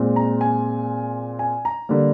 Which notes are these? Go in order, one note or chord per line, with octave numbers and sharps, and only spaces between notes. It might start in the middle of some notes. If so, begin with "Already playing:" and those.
Already playing: A#2 G#3 C4
A#5
G#5
G#5
A#5
D3 G3 A#3